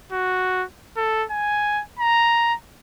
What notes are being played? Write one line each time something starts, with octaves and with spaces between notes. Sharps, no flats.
F#4
A4
G#5
A#5